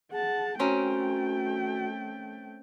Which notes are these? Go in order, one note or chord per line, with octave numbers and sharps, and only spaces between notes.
G#4 F#5 A5
A3 C4 C#4 F#4 A#4 G5